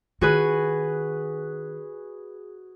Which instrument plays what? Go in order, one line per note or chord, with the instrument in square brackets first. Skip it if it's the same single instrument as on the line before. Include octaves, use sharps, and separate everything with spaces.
[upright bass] D#3 [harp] F#4 G#4 B4